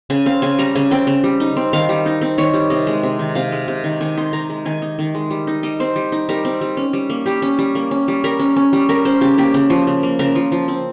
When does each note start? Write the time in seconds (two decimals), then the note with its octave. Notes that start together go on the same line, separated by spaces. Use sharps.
0.10 C#3 G#5
0.26 C4 F5
0.42 C#3 G#5
0.58 G3 A#5
0.75 C#3 G#5
0.91 C4 G5
1.07 C#3
1.24 G3
1.40 D#4
1.56 C4
1.73 D#3 F5
1.89 G3
2.06 D#4
2.21 C4
2.38 D#3 C#5
2.54 G3
2.70 C3 D#5
2.87 G#3
3.03 C3
3.19 D#3
3.35 C3 F5
3.52 G#3
3.68 C3
3.84 D#3
4.01 D#3 G#5
4.17 D#4 C6
4.33 D#3 A#5
4.50 G#3
4.65 D#3 G#5
4.82 D#4
4.99 D#3
5.15 G#3
5.31 G3
5.47 D#4
5.63 G3 D#5
5.80 C4 C5
5.96 G3
6.12 D#4
6.29 G3 A#4
6.45 C4
6.61 G3
6.77 C#4
6.93 G3
7.10 A#3
7.26 G3 G4
7.42 C#4
7.59 G3
7.75 A#3
7.91 C#4
8.08 G3
8.24 G3 A#4
8.40 C#4
8.56 C#4
8.73 G3
8.89 G3 A#4
9.05 C#4 C5
9.21 C#3 G4
9.38 A#3 G4
9.54 C#3
9.70 F3
9.87 C#3
10.03 A#3
10.19 C#3 A#4
10.35 F3
10.52 F3
10.68 C4